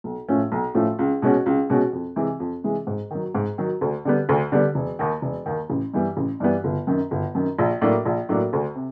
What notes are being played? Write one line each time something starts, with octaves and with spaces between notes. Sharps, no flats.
B1
A2 F3 A3 C#4
B1
A2 F3 A3 C#4
C#2
B2 G#3 C#4 F#4
C#2
B2 G#3 C#4 F#4
F2
C3 E3 G#3
F2
C3 E3 G#3
G#2
D#3 F#3
G#2
D#3 F#3
D2
D3 G3 B3
D2
D3 G3 B3
E1
D#2 D#3
E1
D#2 D#3
A1
G2 E3 G3 B3
A1
G2 E3 G3 B3
G1
F#2 D#3
G1
F#2 D#3
A#1
A2 F#3 A#3 D4
A#1
A2 F#3 A#3 D4
D2
C3